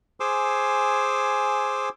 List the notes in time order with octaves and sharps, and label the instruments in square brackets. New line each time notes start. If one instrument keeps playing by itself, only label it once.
[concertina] G#4 C5 G#5 C6 D6 E6